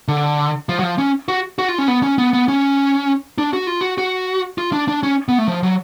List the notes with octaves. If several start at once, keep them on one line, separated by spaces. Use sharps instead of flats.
D3
F3
F#3
F3
C#4
F#4
F#4
F4
C#4
B3
C#4
B3
B3
C#4
D4
F#4
F4
F#4
F#4
F4
D4
D4
C#4
B3
A3
F3
F#3